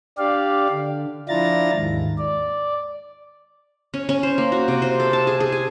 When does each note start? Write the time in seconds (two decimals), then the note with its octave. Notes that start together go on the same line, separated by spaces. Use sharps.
0.18 D4 G4 D5 F5
0.69 D3
1.29 F3 D4 E4 F4 A#5 A6
1.74 D#2 G#2
2.18 D5
3.94 C#4
4.09 C#4
4.23 C5
4.38 A#3
4.52 F#4
4.68 C3
4.82 C5
5.00 A4
5.13 A5
5.27 G#4
5.40 G#4
5.52 G#5